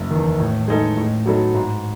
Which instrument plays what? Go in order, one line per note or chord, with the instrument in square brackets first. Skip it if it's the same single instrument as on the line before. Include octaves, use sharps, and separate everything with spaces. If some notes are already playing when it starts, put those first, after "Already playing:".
Already playing: [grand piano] F#1
E2 D#3
A2
G#3 D#4 A4
A2
F#3 B3 D#4 A4
G#2